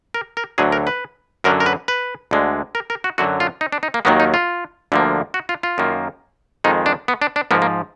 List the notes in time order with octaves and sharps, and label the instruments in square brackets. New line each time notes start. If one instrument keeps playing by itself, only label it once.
[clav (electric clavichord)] A#4
A#4
D2 D3 F#3 G#4
A#4
B4
F#2 D3 F#3 A#4
A#4
B4
B4
D2 D3 G#3
A#4
A#4
F#4
F#2 D3 F#3 F#4
F4
D#4
D4
D#4
A#3
D#2 D#3 F#3 A#3 B3
D#4
F4
D2 D3 F3 A#3
F#4
F4
F4
F#2 D#3 A#3
F2 D#3 G#3 D#4
D4
B3
D4
D4
G#2 F3 A#3 B3
A#3